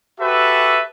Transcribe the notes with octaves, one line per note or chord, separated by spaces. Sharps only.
F#4 G4 A4 B4 E5